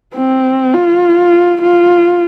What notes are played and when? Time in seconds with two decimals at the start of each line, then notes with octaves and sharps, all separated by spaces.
0.15 C4
0.74 F4
1.62 F4